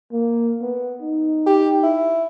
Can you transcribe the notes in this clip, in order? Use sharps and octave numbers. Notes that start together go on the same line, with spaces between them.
A#3
B3
D#4
G4
E4